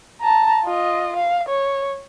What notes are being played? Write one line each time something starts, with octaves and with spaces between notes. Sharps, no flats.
A5 A#5
F4 D#5
F5
C#5